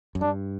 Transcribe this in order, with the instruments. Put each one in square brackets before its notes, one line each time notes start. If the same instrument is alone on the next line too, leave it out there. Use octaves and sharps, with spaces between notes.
[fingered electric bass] F#2
[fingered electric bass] G2 [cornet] D4